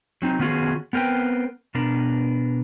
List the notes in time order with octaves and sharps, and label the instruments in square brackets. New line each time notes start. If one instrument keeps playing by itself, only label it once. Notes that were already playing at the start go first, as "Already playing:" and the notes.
[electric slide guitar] F#3 C4 D#4
D#3 B3 C#4 F4 F#4 G#4
B3 C4 A#4 B4 G5
B2 B3 D4 A#4